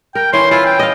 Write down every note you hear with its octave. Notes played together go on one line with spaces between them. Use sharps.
A#4 G5
E3 C#4 C6
E4 F4
G5
D#5 F5